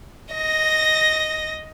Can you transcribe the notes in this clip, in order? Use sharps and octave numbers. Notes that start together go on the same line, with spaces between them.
D#5 A#6